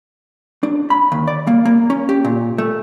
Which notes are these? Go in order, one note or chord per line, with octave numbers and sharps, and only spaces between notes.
D4
B5
D#2
D5
A#3
A#3
C#4
G4
A#2
A3